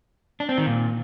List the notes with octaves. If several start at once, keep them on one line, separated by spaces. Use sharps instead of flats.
D4
C4
D#3
A#2